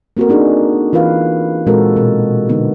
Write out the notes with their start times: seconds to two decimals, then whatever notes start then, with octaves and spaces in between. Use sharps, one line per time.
0.17 A#3 C4 F#4 A4 A#4
0.29 B3 D4 D#4 G#4
0.93 E3 F4 A#4 B4 F5
1.67 A#2 G#3 C4 F#4 A4 A#4
1.96 B2 A#4
2.49 D3 B3 D#4